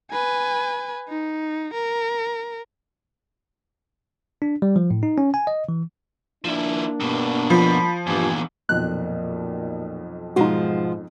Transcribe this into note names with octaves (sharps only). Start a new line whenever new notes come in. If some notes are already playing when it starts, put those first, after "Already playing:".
B4 G#5
D#4
A#4
D4
G3
F3
A2
D#4
C#4
G#5
D#5
E3
F3 A#3 D4 E4
G2 B2
F3 B5
E2 G2 A#2 G#5
B1 F2 A#2 F#6
G#2 B2 F3 G#3 D#4 F#4